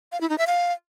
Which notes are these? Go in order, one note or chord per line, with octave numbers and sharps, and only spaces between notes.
F5
E4
D#4
E5
F5